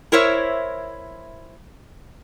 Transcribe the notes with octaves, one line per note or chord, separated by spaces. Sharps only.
E4 A#4 C5 C#5 E5